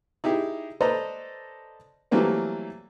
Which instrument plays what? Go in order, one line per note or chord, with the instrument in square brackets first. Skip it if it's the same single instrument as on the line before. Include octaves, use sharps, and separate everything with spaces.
[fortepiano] D#4 E4 G4 G#4
A4 B4 C5 D5 D#5 A#5
E3 F#3 G3 A3 A#3 C4